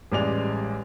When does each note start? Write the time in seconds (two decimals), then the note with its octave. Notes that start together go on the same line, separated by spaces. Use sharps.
0.12 A1 G3 G#3 D5 G#5 F7